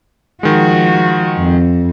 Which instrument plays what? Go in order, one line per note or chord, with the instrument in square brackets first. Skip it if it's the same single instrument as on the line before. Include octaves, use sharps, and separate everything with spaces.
[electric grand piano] D#3 G#3 [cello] F3 F#4
[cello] F2